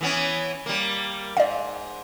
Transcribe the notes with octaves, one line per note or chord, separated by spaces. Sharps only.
E3 B3 C#4
G3 A#3
G#2 D5 F5